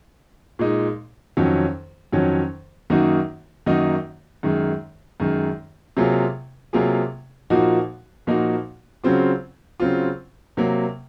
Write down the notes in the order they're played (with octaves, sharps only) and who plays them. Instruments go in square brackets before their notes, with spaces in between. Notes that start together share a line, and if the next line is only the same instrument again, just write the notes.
[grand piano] A#2 G#3 D#4
F2 D#3 F#3 C#4
F2 D#3 F#3 C#4
F#2 D#3 A#3 D#4 F#4
F#2 D#3 A#3 D#4 F#4
F#2 D#3 G#3
F#2 D#3 G#3
C3 F#3 A#3 F4 G#4
C3 F#3 A#3 F4 G#4
A#2 F3 A#3 D#4 F#4
A#2 F3 A#3 D#4 F#4
C#3 F#3 C4 F4
C#3 F#3 C4 F4
C3 F#3 A#3